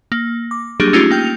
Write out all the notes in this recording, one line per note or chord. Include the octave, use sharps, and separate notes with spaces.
A#3
D6
F#3 G3 A#3 D4 G4 G#4
A3 C#4 D#4 F4 G4
A#3 G5 G6 F7